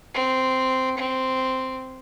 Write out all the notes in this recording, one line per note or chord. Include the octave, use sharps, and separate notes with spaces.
C4
C4